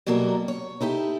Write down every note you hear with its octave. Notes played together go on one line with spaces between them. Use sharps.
B2 F#3 G3 A#3 A4 A#4
C#5
D#4 E4 G4 A4